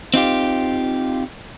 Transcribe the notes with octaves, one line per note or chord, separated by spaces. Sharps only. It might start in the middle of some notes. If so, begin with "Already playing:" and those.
C4 D#4 F4 G4